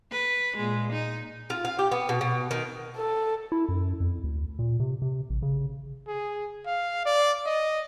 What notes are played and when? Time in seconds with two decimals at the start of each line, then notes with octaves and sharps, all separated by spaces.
0.11 B4
0.57 A#2 G#3
0.92 D#4
1.50 F4
1.65 F5
1.79 G4
1.92 B3
2.09 B2
2.21 B2
2.51 D#3
2.96 A4
3.52 E4
3.69 F#2
4.00 F2
4.24 D2
4.59 A#2
4.80 C3
5.02 C3
5.30 A1
5.42 C#3
6.07 G#4
6.66 F5
7.05 D5
7.46 D#5